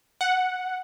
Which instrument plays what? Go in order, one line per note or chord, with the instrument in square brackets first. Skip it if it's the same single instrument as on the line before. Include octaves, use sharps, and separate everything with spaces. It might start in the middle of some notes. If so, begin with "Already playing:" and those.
[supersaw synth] F#5